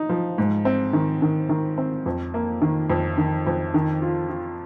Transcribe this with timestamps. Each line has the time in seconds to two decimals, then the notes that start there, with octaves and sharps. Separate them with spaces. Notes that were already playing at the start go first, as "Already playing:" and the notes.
Already playing: D#4
0.09 F3
0.38 G#2
0.65 C4
0.93 D#3
1.22 D#3
1.49 D#3
1.78 C4
2.06 F2
2.34 A#3
2.62 D#3
2.90 F2
3.18 D#3
3.47 F2
3.74 D#3
4.02 F4
4.30 F4